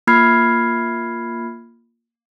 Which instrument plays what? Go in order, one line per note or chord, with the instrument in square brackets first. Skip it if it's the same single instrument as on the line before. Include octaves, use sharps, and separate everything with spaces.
[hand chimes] A#3 F4 B5 F6 G#6 C7